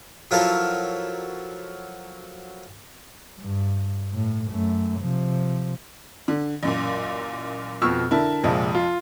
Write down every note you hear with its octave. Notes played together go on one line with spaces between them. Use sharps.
F3 F#3 E4 F4 A4 A#4
G2
A2
F#2 A3
C3 F3
D3
A1 F#2 A#2
F2 B2 C#6 E6 F6
D3 E4 A#4 A5
A#1 F2 C3 F3 G#3
F4